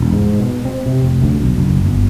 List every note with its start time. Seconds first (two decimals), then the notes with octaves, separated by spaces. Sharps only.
0.01 E1
0.13 G#2
0.39 B2
0.65 C4
0.86 C3
1.02 F1
1.22 D2
1.40 B1
1.58 F#1
1.85 G1